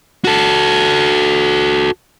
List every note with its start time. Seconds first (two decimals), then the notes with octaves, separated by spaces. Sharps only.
0.24 F#4 A4